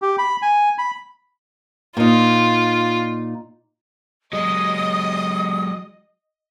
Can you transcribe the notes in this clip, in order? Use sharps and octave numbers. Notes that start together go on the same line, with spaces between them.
G4
B5
G#5
B5
A#2 D#4 F4
F#3 G#3 D#5 D#6